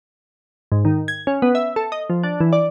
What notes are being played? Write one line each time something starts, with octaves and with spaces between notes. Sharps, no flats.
G#2
D#3
G#6
C#4
B3
E5
A4
D#5
F3
D4
E3
D5